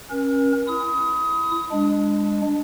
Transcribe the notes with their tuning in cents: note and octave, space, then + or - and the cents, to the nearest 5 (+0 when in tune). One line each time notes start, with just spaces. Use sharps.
C#4 -20 A#4 +40
E4 +20 D#6 +25
G#3 -20 D4 +0